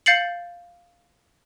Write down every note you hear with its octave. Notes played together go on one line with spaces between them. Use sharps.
F5 G6 A6 C7 C#7 F#7